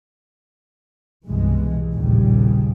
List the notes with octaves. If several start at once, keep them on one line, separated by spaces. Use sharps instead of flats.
C2 G2 B2 E3 G#3
A#1 D#2 A2 C#3 F3 G3